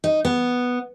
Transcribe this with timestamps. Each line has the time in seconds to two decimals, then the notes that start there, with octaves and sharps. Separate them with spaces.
0.04 D#4
0.25 B3